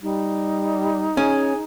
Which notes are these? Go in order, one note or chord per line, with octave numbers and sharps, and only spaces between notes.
G3 D#4
C#4 G#4